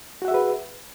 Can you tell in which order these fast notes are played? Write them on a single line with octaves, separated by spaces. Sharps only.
F#4 F#5 E5 G#4 B4